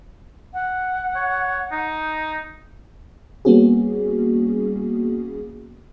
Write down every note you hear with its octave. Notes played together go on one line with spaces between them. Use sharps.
F#5
C#5
D#4
G3 A#3 B3 C#4 F#4 G#4